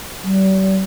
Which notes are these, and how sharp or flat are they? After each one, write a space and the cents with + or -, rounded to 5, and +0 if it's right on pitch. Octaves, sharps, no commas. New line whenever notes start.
G3 -40